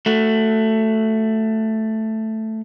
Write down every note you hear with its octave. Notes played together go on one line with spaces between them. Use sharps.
A3 F#4